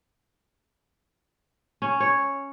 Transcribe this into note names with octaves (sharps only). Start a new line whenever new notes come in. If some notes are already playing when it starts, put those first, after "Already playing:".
C#4
C#5